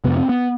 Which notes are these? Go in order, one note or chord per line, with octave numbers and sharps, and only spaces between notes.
F2 C3 B3
C4
B3